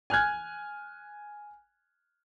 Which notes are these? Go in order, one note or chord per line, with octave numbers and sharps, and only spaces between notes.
G#5 F6 F#6 G#6